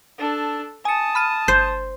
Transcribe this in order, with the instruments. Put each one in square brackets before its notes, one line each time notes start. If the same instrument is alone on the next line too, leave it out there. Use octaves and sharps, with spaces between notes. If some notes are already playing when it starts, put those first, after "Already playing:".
[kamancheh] D4 A4
[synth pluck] G#5 C#7 [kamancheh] A5 D#6
[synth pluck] B5 F6 D#7
[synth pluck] G1 [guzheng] C5